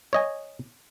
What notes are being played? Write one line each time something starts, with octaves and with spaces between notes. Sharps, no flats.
C#5 D#5 G#5